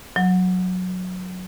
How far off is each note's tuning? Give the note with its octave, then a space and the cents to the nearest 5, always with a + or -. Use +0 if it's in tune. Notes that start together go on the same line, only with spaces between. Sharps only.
F#3 -15